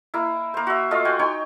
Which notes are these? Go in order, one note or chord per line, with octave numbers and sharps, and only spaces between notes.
A#3 E4
A#3 C5
F#4 E5
A3 F4 D#5 F5
F#4 G5 G#5
D#4 C#5 G5 C6